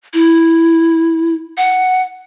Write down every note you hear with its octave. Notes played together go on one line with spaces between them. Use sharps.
E4
F#5